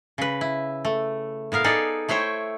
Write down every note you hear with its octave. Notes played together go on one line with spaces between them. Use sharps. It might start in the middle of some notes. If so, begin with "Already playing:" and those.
C#3 B4
E4
A3
A2 B3 A#4 F5
D#4 G#4 A4 D5
A3 E4 C5 C#5 G5